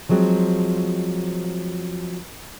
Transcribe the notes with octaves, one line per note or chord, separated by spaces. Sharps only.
F3 F#3 G#3 C4